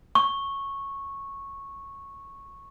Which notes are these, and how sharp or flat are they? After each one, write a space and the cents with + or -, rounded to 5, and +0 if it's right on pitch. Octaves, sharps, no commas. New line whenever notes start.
C#6 -10